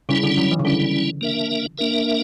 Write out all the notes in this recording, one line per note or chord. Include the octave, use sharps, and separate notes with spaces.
C#3 G3 C#4 E4
D3
F#3
E3
C#3
D3 G3 C#4 E4
A#3 D4 A#4 E5
A#3 D4 A#4 E5